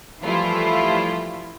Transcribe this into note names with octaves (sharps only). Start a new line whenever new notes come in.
E3 F3 G3 A3 E4 F4